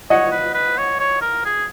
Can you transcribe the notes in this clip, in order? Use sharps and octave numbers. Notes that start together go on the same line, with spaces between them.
C#5 D#5 F#5
B4
B4
C#5
C#5
A#4
G#4